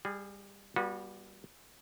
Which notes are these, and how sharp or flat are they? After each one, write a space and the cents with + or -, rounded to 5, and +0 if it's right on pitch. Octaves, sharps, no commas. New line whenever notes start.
G3 +25 G#4 +0
G3 +0 B3 -35 F#4 -35